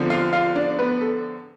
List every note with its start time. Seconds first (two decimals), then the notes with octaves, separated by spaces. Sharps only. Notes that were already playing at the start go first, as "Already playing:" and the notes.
Already playing: E2 D3 F3 C4
0.10 F4 F5
0.33 F4 F5
0.55 D4 D5
0.79 B3 B4
1.01 A4